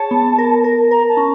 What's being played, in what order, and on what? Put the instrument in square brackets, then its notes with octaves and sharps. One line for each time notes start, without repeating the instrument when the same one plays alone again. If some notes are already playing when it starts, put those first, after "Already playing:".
Already playing: [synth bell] G#4 C#5 [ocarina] A5
[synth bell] B3
A#4
A#4
[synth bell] A#4 [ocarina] A#5
[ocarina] A5
[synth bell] C#4